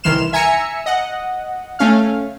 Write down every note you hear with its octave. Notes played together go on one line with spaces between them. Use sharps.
C2 D#3 E3 C6 F6 E7
E5 G#5 A#5 E6 C#7
D#5 F#5
A3 C#4 F5